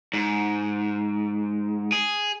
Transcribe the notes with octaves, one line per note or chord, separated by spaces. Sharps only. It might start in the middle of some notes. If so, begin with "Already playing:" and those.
G#2
G#4